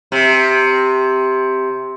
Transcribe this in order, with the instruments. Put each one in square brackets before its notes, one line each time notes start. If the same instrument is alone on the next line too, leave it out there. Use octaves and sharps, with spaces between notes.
[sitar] C3